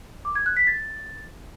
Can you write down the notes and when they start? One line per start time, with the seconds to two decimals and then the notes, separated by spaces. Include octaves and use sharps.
0.25 D6
0.35 G#6
0.46 F#6
0.57 B6
0.67 A6